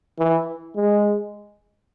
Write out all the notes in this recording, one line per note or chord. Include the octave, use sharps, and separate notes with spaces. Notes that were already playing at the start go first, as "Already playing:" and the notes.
E3
G#3